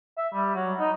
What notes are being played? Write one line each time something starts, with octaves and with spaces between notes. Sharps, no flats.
E5
G3
F#3
D#4